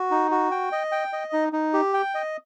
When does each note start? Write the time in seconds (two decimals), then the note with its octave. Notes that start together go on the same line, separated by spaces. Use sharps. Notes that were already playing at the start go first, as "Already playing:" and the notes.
Already playing: F#4
0.11 D#4
0.31 F#4
0.51 G5
0.72 D#5
0.92 G5
1.13 D#5
1.33 D#4
1.53 D#4
1.73 G4
1.94 G5
2.15 D#5